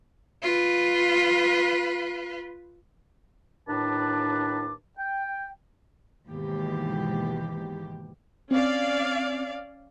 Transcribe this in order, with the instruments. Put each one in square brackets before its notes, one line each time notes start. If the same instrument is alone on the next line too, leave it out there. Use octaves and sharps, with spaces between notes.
[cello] F4 B4
[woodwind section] D#2 A2 D4 B4 A5 D6
G5
[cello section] D#2 G#2 B2 E3 G4
[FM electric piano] C4 [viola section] C#4 D5 F5